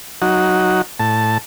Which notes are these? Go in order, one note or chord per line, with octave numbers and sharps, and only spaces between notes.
F#3 D#4 F#4
A2 A5